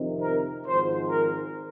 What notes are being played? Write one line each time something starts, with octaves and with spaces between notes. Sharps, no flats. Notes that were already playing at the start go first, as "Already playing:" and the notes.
Already playing: F2 C3 D#3 C4
A#4
G#1 G#2 F3 C5
A#4